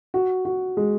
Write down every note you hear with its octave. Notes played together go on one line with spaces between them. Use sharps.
F#4
F#4
G#3